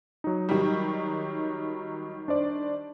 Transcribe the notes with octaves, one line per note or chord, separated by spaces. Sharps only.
F#3 D#4
D#3 G3
D4 C5 D5